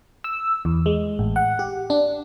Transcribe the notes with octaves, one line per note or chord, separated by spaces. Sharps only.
E6
E2
G#3
A1
F#5
G4
D4